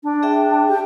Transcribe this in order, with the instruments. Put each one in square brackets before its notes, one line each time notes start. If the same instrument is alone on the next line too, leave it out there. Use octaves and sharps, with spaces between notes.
[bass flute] D4
[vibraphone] G#4 E5 G5
[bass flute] G4